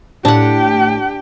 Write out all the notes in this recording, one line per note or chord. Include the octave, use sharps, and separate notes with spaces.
A2 D4 G4 F#5 G5